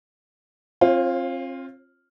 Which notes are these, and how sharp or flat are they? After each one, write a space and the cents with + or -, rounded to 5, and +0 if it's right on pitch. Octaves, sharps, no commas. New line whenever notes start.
C4 +35 F4 +0 C#5 -30